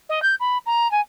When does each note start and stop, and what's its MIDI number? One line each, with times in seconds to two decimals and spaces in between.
0.09 0.22 75
0.22 0.35 91
0.40 0.58 83
0.66 0.90 82
0.91 1.01 80